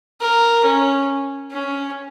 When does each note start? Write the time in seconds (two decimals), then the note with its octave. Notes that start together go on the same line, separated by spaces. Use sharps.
0.20 A#4
0.65 C#4
1.52 C#4